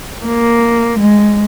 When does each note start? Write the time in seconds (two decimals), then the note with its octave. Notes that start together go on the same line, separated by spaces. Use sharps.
0.25 A#3
0.99 G#3